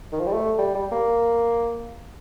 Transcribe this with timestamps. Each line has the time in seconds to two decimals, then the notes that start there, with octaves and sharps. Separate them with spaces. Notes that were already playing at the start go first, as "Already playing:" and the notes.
0.13 D#3
0.20 F3
0.27 G3
0.33 A3
0.58 G3
0.75 G3
0.92 A#3